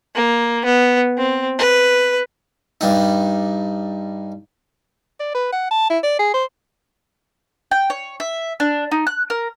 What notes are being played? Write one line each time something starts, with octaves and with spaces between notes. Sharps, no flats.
A#3
B3
C4
B4
G2 G3 D#4
D5
B4
F#5
A5
E4
D5
G#4
C5
G5
C#5
E5
D4
D#4
F#6
A#4